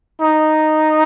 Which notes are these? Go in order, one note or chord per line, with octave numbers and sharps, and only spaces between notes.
D#4